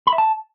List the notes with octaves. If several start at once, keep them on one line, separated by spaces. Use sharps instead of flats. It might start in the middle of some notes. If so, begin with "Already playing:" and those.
B5
E5
A5